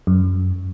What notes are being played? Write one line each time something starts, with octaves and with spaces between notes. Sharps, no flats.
F#2